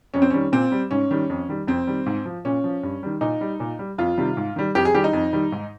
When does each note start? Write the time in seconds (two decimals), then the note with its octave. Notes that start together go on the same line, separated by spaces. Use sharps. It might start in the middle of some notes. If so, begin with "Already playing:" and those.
0.14 F2 C#4
0.22 C4
0.30 D#3 G3 C#4
0.52 A#2 C4
0.72 G3
0.91 G#2 C#4
1.11 D#3 G3
1.30 F2
1.49 D#3 G3
1.67 F2 C4
1.87 D#3 G3
2.06 G#2
2.26 F3
2.45 A#2 C#4
2.64 F3
2.83 G2
3.03 D#3 G3
3.21 A#2 D#4
3.41 G3
3.60 A#2
3.79 G3
3.98 F2 F4
4.17 C3 D#3 G3
4.37 G#2
4.56 D#3 G3
4.75 F2 G4
4.85 G#4
4.95 D#3 G3 G4
5.04 D#4
5.13 F2
5.33 D#3 G3
5.52 G#2